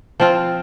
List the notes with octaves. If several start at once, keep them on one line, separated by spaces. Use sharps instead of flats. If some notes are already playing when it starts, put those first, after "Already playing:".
F3 C4 F4